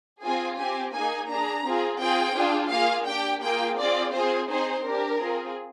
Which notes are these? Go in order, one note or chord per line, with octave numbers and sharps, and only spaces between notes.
C4 F4 G#4 G#5
C4 G4 G#5
A#3 D#4 G#4 G#5
D4 G#4 A#5
C4 F4 G#4
C4 F4 G#4 G5
D4 F4 G#4
A#3 F4 G#4 F5
D4 G4 G5
A#3 F4 G#4 G5
C4 F4 G#4 D5
C4 F4 G#4 C5
C4 D#4 G#4 C5
D4 G4 A#4
C4 F4 G#4